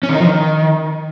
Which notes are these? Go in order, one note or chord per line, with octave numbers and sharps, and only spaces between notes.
C#4
D#3
D#4
F3
D#3